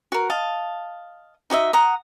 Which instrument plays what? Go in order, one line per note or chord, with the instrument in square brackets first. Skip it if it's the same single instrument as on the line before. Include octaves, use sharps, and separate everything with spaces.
[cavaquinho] F#4 A#4
D#5 F5 A5
D#4 F#4 D#5 E5
F#5 A#5 D#6